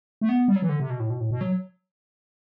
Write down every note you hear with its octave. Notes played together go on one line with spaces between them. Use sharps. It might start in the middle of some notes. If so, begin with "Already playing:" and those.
A3
B3
G3
F#3
E3
D3
C3
B2
A2
B2
A2
B2
F#3